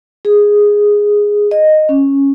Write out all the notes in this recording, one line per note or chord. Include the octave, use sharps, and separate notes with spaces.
G#4
D#5
C#4